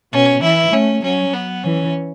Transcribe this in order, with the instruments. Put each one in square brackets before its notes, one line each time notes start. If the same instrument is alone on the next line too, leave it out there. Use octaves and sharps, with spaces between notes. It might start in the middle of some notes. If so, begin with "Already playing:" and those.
[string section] B2 [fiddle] C#4
[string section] E3 [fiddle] E4
[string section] A3 [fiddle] C#4
[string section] F#3 [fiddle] C#4
[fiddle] B3
[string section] E3 [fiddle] C#4